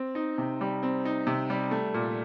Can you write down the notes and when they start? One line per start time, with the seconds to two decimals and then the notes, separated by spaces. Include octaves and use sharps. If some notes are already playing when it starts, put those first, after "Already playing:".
Already playing: C4
0.15 D#4
0.38 C3
0.61 G3
0.83 C4
1.05 D#4
1.27 C3
1.50 G3
1.71 A3
1.94 A#2